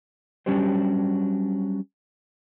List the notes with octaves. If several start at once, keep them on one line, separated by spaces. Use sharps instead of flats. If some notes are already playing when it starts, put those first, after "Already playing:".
F#3 G3 C#4 D4 G4 C5